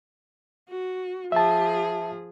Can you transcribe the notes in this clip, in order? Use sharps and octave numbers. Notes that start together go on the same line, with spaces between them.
F#4
F3 G#4 E5 A5